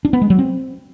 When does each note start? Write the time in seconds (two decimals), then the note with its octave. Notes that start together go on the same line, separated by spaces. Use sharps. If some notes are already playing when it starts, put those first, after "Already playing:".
0.05 D4
0.13 B3
0.22 G#3
0.30 F#3
0.39 C4